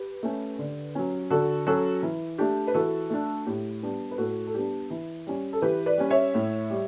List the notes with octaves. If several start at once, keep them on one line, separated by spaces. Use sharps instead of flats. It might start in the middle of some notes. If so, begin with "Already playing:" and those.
Already playing: G4 B4
A3 C#4
D3
F#3 C#4
D3 F#4 A4
F#3 C#4 F#4 A4
E3
A3 D4 G4
B4
E3 F#4 A4
A3 D4
A2 G4
G3 B3 D4
B4
A2 F#4 A4
A4
G3 B3 D4 G4
E3
G3 C#4
A4
E3 G4 B4
B4 D5
G3 C#4
C#5 E5
A2
G3